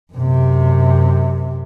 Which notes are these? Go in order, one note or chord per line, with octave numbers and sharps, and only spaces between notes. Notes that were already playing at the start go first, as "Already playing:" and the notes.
F#2 C3